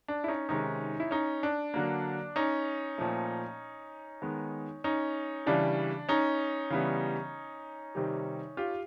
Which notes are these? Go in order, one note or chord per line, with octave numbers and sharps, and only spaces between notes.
D4
E4
C#4 D#4
C3 D#3 G#3 C#4 D#4
E4
C#4 D#4
D4
D3 F#3 A#3
C#4 D#4
A#2 F3 A3
D#3 G#3 B3
C#4 D#4
C#3 E3 G3 D4
C#4 D#4
C#3 E3 G3 B3
C3 D#3 G3
F4 G4